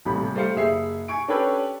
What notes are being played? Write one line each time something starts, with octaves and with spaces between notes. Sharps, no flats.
D#1 A1 C3 B5
G3 A3 C5 F5 C#7
F#1 G#4 E5 C7
G#5 C#6 D7
C#4 D4 G4 A4 B4 C#5